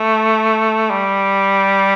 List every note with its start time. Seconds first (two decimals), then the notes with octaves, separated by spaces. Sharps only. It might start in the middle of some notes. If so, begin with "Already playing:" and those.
Already playing: A3
0.90 G3